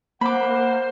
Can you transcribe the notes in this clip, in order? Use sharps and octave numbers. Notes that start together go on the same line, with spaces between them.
A#3 C5 F#5 B5 D6